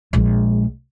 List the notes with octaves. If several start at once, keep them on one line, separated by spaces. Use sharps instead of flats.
A#1 G#3